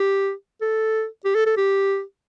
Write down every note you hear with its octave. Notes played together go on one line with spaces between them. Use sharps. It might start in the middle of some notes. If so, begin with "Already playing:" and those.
Already playing: G4
A4
G4
A4
A4
G4